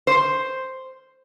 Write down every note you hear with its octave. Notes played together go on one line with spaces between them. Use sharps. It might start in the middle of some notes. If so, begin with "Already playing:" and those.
C5